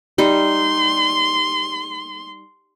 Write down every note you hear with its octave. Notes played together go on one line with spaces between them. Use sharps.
G3 D#4 C6